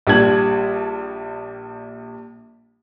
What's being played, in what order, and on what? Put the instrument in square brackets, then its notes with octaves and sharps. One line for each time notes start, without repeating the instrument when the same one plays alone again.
[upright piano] A#1 G3 D4 A5 G#6 F#7